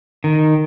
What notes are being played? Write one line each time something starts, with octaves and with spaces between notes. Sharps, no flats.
D#3